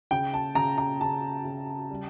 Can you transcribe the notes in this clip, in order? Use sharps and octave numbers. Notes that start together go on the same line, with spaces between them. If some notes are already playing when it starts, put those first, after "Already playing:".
C#3 G5
A5
C#3 A#5
A#5
C#3 A5
C#3
G3